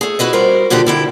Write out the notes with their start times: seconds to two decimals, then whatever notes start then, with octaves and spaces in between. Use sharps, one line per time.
0.01 A3 G#4
0.19 E4 F#4 B4 D#5
0.33 G3 F#4 A#4 C5
0.70 A#2 D3 D#3 G3 F#4 G4
0.87 D3 E4 G5